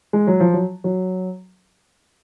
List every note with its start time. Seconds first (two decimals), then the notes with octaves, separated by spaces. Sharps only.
0.13 G#3
0.27 F#3
0.40 F3
0.54 F#3
0.84 F#3